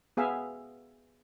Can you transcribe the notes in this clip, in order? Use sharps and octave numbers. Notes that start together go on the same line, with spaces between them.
B3 G#4 E5 F5